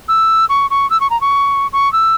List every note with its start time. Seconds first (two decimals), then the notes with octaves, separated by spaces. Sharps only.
0.08 E6
0.49 C#6
0.70 C#6
0.90 E6
1.00 C#6
1.10 A#5
1.21 C#6
1.73 C#6
1.93 E6